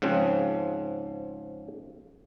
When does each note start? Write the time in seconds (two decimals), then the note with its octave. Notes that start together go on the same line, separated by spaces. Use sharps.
0.02 G#2 C#3 F3 C4